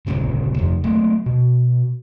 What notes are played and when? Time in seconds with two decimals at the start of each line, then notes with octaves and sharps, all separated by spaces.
0.07 G1 G2 A#2 C#3
0.58 F2 C3 F3
0.84 F#3 A3 A#3
1.26 B2